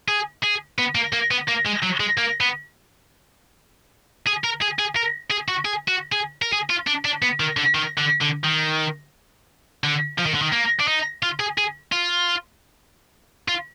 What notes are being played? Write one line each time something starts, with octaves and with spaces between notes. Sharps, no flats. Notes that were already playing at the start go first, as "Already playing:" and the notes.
G#4
G#4
B3
A#3
A#3
B3
A#3
G#3
F#3
G#3
A#3
B3
G#4
A#4
G#4
G#4
A#4
G#4
F#4
G#4
F#4
G#4
A#4
G#4
F4
D4
D4
B3
D#3
D3
D#3
D3
D3
D#3
D3
F3
D#3
D3
D#3
A#3
D4
D#4
F4
G#4
G#4
F4
F4